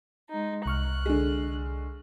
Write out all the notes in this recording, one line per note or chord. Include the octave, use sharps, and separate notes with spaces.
G#3 D#4
C2 C#6 F6 F#6
D3 G#3